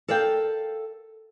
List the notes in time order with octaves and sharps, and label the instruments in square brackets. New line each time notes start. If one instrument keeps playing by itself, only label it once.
[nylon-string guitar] A4 A#4 D5 F5 G5